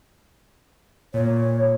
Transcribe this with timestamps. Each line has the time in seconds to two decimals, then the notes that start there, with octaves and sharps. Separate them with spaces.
1.14 A#2 C#5